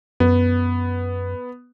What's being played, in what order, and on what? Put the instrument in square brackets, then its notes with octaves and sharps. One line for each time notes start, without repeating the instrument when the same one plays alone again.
[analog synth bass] F#2 [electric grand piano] B3